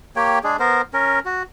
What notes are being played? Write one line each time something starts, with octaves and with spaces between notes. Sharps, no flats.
A#3 G4 C#5 G5
G#3 D4 G#4
B3 A#4 C5
C#4 A#4
F#4